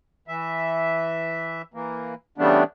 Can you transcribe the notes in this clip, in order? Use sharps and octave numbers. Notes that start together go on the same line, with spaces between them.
E3 E5
E3 A#3
C#3 E3 G3 A3 B3 D4